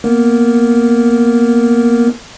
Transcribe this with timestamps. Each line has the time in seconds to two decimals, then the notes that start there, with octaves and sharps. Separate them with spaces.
0.04 A#3 B3 A#4